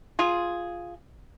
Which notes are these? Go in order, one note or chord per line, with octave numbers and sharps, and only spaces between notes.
F4 G#4